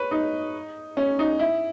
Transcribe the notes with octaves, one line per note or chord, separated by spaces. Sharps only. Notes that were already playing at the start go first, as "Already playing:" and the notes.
Already playing: B4 C#5
D#4
C#4
D#4
E4